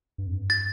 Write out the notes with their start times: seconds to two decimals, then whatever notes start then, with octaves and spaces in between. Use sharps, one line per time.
0.18 G2
0.26 F2
0.34 G2
0.50 A6